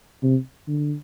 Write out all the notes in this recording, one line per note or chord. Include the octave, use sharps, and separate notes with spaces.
C3
D3